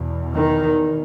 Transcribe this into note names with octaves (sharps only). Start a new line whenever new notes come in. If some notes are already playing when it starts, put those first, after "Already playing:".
Already playing: E2 B2
D#3